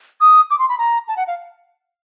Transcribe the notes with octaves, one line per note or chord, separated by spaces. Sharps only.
D#6
D6
C6
B5
A#5
A5
F#5
F5